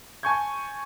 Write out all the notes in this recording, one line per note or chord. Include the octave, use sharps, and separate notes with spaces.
G#5 A5 C#6 G6 G#6